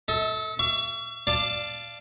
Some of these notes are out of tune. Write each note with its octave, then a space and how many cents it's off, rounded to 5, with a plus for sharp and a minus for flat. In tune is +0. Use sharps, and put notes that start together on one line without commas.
A4 +0 E5 -45
E5 +45 C#6 +40
D5 +10 F5 -20 A5 +0